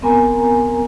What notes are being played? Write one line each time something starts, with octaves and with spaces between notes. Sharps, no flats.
B3 C4 A#4 G#5 A#5